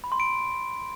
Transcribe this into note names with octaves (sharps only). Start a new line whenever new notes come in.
B5
C6
D7